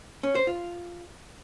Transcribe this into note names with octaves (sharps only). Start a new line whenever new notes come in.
C#4
C5
F4